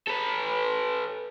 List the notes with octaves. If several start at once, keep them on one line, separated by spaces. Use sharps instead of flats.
A4 B4